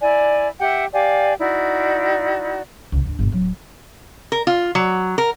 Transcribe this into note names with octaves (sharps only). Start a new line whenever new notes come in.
E4 D5 G#5
G4 E5 F#5 G5
G4 D5 F5 G#5
D#4 E4 F#4 D5
C#2 A2
G#1 D2
G1 A#2
D1 F#3
A#4
F4
F#3
A#4